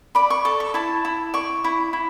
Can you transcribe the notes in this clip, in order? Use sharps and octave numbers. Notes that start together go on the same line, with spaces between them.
D5 B5
C#6
A4 D6
C#6
E4 A5
E4
D5 C#6
E4
E4